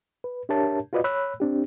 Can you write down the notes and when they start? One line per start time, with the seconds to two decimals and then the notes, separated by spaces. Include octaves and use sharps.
0.24 B4
0.49 D4 G4 A#4 C#5 E5 A5
0.93 F4 F#4 B4 D5 D#5
1.04 C#5 B5 E6 F#6
1.40 C4 D4 G4